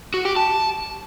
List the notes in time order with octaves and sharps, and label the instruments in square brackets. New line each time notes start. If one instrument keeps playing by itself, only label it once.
[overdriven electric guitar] F#4
G4
A5